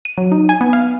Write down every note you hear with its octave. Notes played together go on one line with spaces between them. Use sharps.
D#7
F#3
D#4
G#5
B3
F5